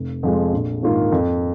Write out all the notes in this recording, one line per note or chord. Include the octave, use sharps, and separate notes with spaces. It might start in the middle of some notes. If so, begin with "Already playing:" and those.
Already playing: F1
F2 F3 G#3
A#1
G#2 D#3 A#3 F4
F2